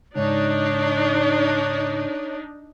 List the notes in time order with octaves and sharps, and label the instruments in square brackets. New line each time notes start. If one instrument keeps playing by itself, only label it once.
[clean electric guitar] C#2 G#2 [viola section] D4 D#4 [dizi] C#5